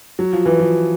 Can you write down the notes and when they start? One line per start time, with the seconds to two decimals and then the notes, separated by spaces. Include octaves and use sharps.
0.19 F#3
0.33 F3
0.46 E3
0.60 F3